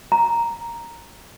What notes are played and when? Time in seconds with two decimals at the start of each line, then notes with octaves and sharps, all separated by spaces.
0.12 A#5